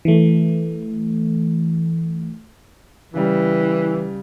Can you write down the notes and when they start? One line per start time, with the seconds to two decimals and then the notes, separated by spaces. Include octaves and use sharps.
0.05 E3 A3
3.14 C#3 E3 G3